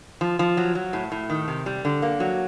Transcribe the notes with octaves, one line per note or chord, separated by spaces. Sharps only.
F3
F3
F#3
F#3
A2
A2
D#3
C3
G3
D3
A#3
F#3